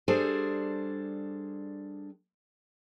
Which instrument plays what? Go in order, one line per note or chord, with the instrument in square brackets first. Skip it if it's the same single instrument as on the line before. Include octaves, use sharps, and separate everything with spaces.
[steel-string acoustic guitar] G3 D4 G#4 A4 C5